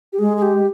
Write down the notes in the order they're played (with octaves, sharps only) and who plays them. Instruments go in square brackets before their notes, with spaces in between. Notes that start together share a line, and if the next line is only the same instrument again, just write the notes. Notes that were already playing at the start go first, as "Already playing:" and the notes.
[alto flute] G4
[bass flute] G#3 [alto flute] G#4
[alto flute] G#4
G4